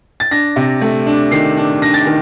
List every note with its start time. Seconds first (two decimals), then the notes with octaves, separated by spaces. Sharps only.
0.20 A6
0.31 D4 A#6
0.56 C3
0.81 A3
1.07 D4
1.31 D#3 C7
1.57 D4
1.82 D4 A#6
1.94 A6
2.06 D#3